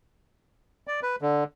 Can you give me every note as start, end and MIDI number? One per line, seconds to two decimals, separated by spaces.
0.87 1.00 74
1.03 1.16 71
1.22 1.44 50